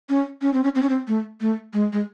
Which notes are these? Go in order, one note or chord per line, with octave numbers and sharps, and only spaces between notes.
C#4
C#4
C4
C#4
C4
C#4
C4
A3
A3
G#3
G#3